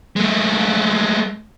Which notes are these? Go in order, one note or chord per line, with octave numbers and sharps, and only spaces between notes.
G#3 A3